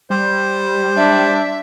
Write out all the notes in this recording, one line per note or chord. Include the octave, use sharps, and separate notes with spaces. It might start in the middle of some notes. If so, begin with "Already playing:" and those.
G3 C5
D4 E5